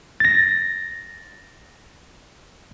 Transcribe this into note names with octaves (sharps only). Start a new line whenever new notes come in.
A6 A#6